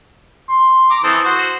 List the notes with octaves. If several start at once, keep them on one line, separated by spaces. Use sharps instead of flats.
C6
A#5 D6
E3 C4 A4 D#6
F#4 C5